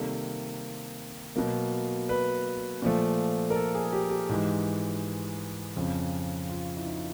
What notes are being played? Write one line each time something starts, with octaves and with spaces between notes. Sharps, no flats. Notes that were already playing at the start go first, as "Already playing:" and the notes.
Already playing: C3 D#3 G3 A#3 A4
B2 F#3 A#3
B4
A#2 F3 A3
A#4
A4
G#4
G#4
G4
G4
G#2 E3 G#3
F2 C#3 F3
F4
E4
D#4